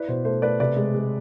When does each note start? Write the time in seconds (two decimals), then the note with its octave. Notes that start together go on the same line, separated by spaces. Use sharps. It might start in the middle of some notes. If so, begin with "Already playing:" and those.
Already playing: E4 B4 D5
0.08 B2 C5
0.25 A3 C5
0.42 A3 B4 D5
0.60 C3 B4 D5
0.76 G#3
0.95 G#3